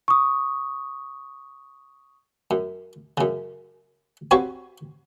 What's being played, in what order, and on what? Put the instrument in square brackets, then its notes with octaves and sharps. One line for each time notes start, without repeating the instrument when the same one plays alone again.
[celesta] C#6 D#6
[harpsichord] F#2
F#2 C#3
C4 F#4 G4 B4 C#5 F5